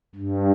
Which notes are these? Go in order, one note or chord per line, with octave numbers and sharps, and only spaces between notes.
G2